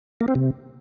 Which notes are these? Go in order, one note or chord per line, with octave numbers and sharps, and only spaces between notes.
A#3
C4
C3